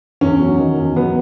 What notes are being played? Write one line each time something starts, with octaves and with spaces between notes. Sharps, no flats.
E2 C#4
F#3
D#3
E2
F#3 B3